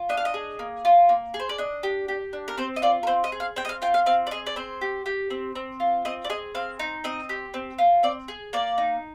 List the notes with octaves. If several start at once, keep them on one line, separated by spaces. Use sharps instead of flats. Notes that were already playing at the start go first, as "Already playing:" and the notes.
Already playing: F4
D4 D#5
F5
D#5
G#4
A#3
F4
A#3
G#4
C5
D5
D4 D#5
G4
G4
D4
A#4
C4 C5
D#5
F4 D5
A#4
C4 C5
D#5
G#4
F5
C4 G5
D#5
F5
F4 G5
F5
C4 F5
D5
G#4 D#5
D5
C4 C5
G4
G4
C4
C4
F4
C4 D#5
D5
G#4 D#5
C4 F5
D#4
C4 D#5
G4
C4
F4
C4 D5
G#4
A#3 D5
D#4